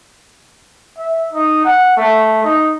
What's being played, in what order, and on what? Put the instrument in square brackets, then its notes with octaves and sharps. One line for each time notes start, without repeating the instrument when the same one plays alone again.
[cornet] E5
D#4
F#5
A3
D#4